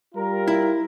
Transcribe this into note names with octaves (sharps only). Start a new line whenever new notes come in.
G3 F4 A#4
E4